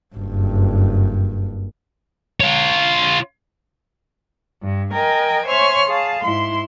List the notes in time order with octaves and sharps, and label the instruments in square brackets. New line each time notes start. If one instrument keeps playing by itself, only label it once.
[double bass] F#1 G2
[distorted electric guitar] F4 C#5
[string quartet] G2
A#4 D#5 G5 G#5
C5 C#5 E5 G#5 C6 F6
G#4 F5 A5
G#2 E4 C6